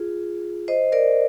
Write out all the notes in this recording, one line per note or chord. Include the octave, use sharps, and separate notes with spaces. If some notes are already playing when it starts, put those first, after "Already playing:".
Already playing: F4 G#4
C5 D#5
A#4 D5